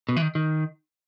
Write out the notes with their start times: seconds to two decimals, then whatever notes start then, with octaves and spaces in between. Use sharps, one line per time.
0.09 B2
0.16 E3
0.22 D#3
0.35 D#3